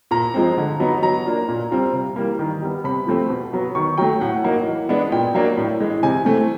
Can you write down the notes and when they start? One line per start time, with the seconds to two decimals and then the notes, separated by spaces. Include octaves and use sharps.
0.11 A#2 A#5
0.34 F3 G#3 C4
0.58 D3
0.80 F#3 B3 D#4
1.02 F#3 A#5
1.26 A#3 D4 F4
1.49 A#2
1.71 G3 C4 F4
1.93 C3
2.16 E3 G3 A#3
2.39 D#3
2.62 G3 B3
2.84 C3 B5
3.07 F3 A3 C4
3.30 B2
3.53 F#3 B3
3.75 D#3 C#6
3.98 F#3 A3 G5
4.21 A2 F#5
4.44 F#3 A#3 D#4
4.66 E3
4.89 G#3 B3 D4
5.12 A#2 G5
5.34 F#3 A#3 D4
5.57 A2
5.80 E3 G#3
6.03 C3 G#5
6.25 E3 A3 C4